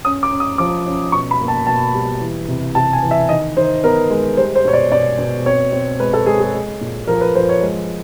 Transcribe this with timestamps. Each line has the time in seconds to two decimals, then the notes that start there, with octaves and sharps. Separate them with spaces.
0.05 C#4 D#6
0.23 D6
0.31 C#4
0.40 D#6
0.58 F3 D6
0.86 C#4
1.12 B2 C#6
1.31 B5
1.40 A#3
1.48 A5
1.67 B2 A5
1.94 G3
2.20 E3
2.48 C3
2.75 C3 A5
2.93 G#5
3.02 E3
3.11 E5
3.29 D#3 D#5
3.56 D#3 C5
3.83 B3 A#4
4.10 G#3
4.37 G3 C5
4.55 C5
4.65 B2 C#5
4.73 D5
4.92 B2 D5
5.18 B2
5.46 C4 C#5
5.72 C4
6.00 G#3 B4
6.13 A4
6.26 G#3 G#4
6.40 G#4
6.54 G#3
6.81 A#2
7.07 F3 A#4
7.21 B4
7.35 F3 C5
7.49 C#5
7.62 G#3